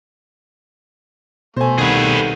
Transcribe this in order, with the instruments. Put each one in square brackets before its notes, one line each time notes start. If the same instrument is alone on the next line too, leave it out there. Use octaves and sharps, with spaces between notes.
[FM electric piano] B2 [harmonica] A3 [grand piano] C5 G#5
[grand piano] C2 D#3 [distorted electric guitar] G#4 B4